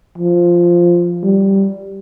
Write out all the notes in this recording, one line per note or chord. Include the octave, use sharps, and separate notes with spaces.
F3
G3